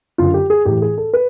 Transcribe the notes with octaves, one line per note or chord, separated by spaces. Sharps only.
F#2 D3 F4
G4
G#4
A2 E3 G4
G#4
A4
B4